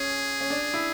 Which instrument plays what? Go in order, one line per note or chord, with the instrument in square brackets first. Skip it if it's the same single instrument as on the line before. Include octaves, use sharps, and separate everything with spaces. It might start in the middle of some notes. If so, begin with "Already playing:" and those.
Already playing: [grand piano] C#4 [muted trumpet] G#4
[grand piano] C#4
D4
E4